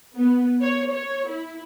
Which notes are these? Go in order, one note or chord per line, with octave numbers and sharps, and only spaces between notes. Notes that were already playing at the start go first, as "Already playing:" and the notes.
B3
C#5
C#5
E4